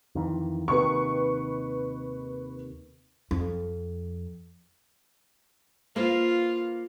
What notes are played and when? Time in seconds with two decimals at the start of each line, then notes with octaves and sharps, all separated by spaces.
0.15 F2 D#3 E3
0.68 D#2 C3 D#3 B4 C#6
3.31 F2
5.96 A#3 F4 B4 C5